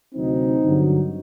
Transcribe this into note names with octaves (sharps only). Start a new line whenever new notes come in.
D2 C3 F#3 C4 D#4
G2 D3 F#3